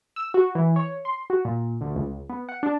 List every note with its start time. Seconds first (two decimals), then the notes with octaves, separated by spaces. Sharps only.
0.16 E6
0.34 F#4
0.55 E3
0.76 C#5
1.05 C6
1.30 F#4
1.45 A#2
1.81 D2
1.95 C#2
2.30 B3
2.49 F#5
2.63 D4